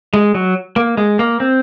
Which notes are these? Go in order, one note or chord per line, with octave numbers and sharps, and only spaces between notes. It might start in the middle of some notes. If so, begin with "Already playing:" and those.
G#3
F#3
A#3
G#3
A#3
C4